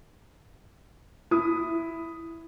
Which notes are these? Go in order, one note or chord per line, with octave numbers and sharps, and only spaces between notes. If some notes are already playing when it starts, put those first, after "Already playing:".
E4 D#6